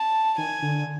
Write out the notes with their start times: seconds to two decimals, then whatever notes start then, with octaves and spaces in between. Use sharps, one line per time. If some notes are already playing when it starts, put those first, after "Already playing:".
Already playing: A5
0.38 D#3 G#5
0.63 D3